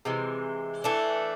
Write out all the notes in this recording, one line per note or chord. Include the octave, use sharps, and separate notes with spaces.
C3 E3 G#3
E3 A3 D4